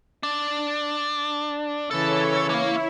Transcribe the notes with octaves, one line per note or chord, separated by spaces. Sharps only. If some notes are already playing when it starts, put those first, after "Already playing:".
D4
C#3 E3 A4 C#5
A#3 E4 F5